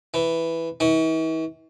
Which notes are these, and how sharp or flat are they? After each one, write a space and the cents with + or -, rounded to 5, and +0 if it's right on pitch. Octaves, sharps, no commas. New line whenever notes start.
E3 +0
E3 -45